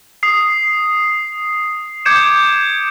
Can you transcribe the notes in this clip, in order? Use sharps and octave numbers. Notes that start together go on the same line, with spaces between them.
D#6 C7
D6 G6 G#6 C#7 D7 E7